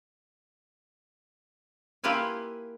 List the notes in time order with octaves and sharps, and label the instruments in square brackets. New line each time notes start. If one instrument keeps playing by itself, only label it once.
[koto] A#3 E4 F4 G4 B4 G#5